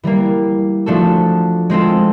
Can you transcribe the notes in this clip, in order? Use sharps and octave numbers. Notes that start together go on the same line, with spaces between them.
E3 G3 A#3
F3 A3 D4 F#4 A4
G#3 C4 F4 A4